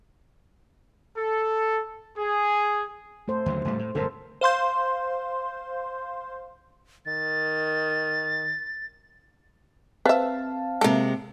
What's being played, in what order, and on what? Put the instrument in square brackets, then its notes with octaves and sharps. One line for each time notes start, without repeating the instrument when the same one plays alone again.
[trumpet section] A4
G#4
[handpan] A3 A4 C5
[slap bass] D#2 D3 F#3
C#2 A2 G3
A2
[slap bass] G1 F#2 B2 [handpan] A4 A#4 C5
[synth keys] C5 F5 C6 G6
[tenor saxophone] D#3 [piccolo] A6
[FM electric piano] C4 F5 A5 [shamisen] B4 E5
[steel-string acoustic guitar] C3 G#3 [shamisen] A#3 A4